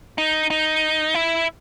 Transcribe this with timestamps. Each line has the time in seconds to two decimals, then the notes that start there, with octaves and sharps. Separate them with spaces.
0.18 D#4
0.50 D#4
1.15 E4